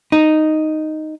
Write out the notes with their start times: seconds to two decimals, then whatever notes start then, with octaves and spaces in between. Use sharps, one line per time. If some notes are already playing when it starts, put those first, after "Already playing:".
0.12 D#4